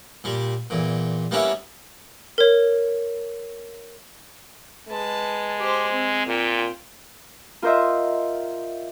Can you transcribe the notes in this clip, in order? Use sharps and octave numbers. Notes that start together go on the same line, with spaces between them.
A#2 G3
E2 A#2
G3 A#3 B3 C#4 D4 E4
A#4 C#5
G#3 B4 A5
G4 C5
C4
A#2 F4 G5
F4 A#4 C5 D#5 E5